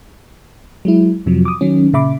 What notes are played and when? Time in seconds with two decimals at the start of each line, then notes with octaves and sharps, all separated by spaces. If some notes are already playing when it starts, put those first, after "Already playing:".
0.85 F#3 G#3 E4
1.26 F2 C3 F3 F#3
1.45 D6 D#6
1.61 D#3 F#3 C#4
1.93 A#2 C#3 E5 B5 D6